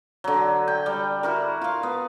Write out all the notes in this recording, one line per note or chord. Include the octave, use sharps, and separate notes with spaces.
D3 F#3
G5
G3
E4 F#4 A#4
F4 F5
B3